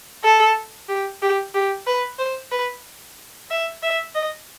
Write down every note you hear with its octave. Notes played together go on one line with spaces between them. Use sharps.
A4
G4
G4
G4
B4
C5
B4
E5
E5
D#5